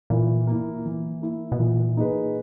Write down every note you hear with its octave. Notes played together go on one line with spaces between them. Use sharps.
A#2 E3
A#3 E4
E3
A#3 E4
B2
A#2 E3
A#3 D#4 G#4 B4